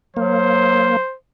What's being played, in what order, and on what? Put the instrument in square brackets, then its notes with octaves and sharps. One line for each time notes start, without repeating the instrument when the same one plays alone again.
[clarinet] F#3 [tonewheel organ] A#3 [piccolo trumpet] C5